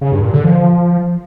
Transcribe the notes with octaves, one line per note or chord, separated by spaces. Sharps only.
C#3
G2
A#2
D3
F3